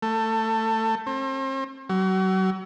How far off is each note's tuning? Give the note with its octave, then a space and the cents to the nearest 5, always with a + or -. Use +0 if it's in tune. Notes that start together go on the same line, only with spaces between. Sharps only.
A3 +20
C4 +40
F#3 +35